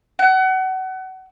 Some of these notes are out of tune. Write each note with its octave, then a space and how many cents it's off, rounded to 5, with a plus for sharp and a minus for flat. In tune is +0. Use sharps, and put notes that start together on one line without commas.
F#5 +30